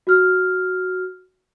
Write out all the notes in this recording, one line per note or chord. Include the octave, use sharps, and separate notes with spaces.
F#4 F6